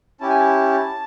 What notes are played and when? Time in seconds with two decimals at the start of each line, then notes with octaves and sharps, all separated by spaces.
0.20 C#4 E4 G4 A5
0.29 G#5
0.39 A5